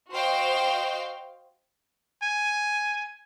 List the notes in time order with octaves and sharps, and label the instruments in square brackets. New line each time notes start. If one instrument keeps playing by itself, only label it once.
[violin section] F#4 C5 D#5 F5 G5
[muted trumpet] G#5